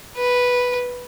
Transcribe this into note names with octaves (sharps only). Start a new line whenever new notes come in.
B4